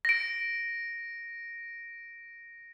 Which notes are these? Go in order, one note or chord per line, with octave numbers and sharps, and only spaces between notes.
A#6 D7